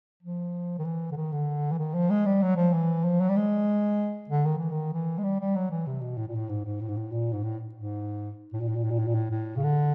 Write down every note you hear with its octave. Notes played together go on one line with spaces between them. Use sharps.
F3
D#3
E3
D3
D#3
D3
E3
D#3
F3
G#3
G3
F#3
F3
E3
F3
F#3
G3
G#3
D3
D#3
E3
D#3
E3
G#3
G3
G3
F#3
E3
C3
B2
A2
A#2
A2
G#2
G#2
A2
G#2
A2
A#2
G#2
A2
G#2
A2
A#2
A2
A#2
A2
A#2
A2
A#2
A2
A2
C#3
D3